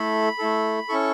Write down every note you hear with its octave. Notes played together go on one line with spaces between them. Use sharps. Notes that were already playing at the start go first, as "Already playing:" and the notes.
Already playing: A3 E4 A4 B5
A3 E4 A4
C#4 E4 A4 C#6